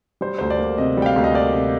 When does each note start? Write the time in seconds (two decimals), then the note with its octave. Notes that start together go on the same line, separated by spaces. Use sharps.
0.21 G3 C5
0.38 D2 C5
0.50 D5
0.59 A#3
0.78 C3 D#5
0.97 G3 G5
1.06 F5
1.16 D2
1.24 D#5
1.34 A#3 D5
1.54 C3